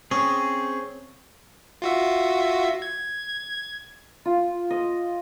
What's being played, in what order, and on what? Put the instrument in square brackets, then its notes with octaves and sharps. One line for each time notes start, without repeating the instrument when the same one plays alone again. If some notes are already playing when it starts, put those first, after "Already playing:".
[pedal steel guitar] C4 G#4 [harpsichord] C#4
[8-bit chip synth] F4 F#4 E5
G#6
[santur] F4
D#5